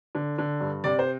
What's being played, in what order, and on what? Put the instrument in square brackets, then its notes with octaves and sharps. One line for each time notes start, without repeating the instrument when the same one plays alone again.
[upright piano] D3
D3
G2
C3 D5
C5